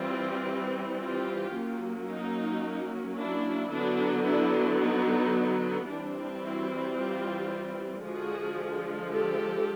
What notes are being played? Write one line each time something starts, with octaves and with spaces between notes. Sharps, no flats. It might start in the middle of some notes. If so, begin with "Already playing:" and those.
Already playing: E3 G3 C4 F4 G4
F4 G4
F#3 A#3 C#4
D#4
D4 E4
D3 F#3 B3 D4
D4 E4
D#4
E3 G3 C4 D4
E4 F#4
F4 G4
D3 F3 G#3 F#4 G#4
G4 A4